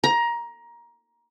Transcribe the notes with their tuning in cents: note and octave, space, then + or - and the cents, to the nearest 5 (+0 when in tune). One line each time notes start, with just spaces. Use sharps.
A#5 +20